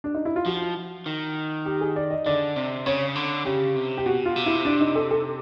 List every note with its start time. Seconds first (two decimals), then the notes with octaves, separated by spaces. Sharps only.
0.04 D4
0.15 D#4
0.25 E4
0.36 F4
0.46 F3 F#4
1.06 D#3
1.66 G4
1.81 G#4
1.96 D5
2.10 D#5
2.26 D3 D5
2.56 C3
2.86 C#3 C#5
3.15 D3
3.45 C#3 G4
3.76 C3
3.97 G4
4.06 B2 F#4
4.26 F4
4.36 C3
4.46 E4
4.65 D4
4.81 D#4
4.95 A4
5.11 A4